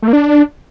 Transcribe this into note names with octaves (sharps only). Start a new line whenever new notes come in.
A3
A#3
D4